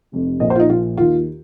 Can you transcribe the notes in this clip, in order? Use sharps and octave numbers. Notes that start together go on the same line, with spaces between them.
F1 F2 C3
A#1 A#2 F3 D#5
C5
F4
D#4
A#1 A#2 F3 F4
D#2 D#3 F4